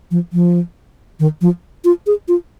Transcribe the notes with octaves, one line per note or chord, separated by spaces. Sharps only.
F3
F3
D#3
F3
F4
G#4
F4